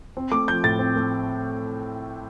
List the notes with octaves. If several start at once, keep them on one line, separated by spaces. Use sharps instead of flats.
C4
A3 D6
F3 G6
A2 A6
C4
A3